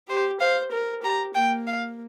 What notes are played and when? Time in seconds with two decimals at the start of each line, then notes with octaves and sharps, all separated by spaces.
0.09 G4 C5
0.41 C5 F5
0.72 A#4
1.03 G4 A#5
1.35 A#3 G5
1.67 F5